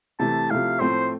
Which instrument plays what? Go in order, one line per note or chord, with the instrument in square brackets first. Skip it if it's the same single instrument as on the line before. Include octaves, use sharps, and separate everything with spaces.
[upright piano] C3 E3 A3 [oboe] A5
[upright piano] C3 F3 A3 E4 [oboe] F5
[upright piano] A2 F3 A3 C4 [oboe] C5